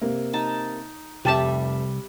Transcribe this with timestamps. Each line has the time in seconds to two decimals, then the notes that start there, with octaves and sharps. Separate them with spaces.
0.01 C3 A#3
0.33 D#4 A5
1.25 F1 C2 G3 G4 E5 A5